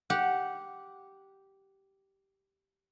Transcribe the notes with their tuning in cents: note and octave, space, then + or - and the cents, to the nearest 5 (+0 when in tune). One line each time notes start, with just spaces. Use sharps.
G4 -10 F#5 -5